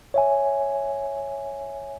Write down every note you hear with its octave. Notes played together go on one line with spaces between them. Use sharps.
C#5 E5 G#5